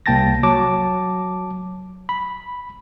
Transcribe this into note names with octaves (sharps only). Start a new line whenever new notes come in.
C2 A#3 G5 A5 A6 A#6
F#3 A5 D6
B5